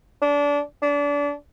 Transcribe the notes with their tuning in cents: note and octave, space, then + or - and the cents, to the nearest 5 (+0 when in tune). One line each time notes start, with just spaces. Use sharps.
D4 -25
D4 -30